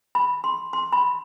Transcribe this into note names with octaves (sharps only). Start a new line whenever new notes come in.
B5
C6
C6
B5